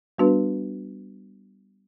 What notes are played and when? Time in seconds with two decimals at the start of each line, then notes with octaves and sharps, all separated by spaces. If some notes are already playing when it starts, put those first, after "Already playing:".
0.18 G3 B3 D4 F#4 B4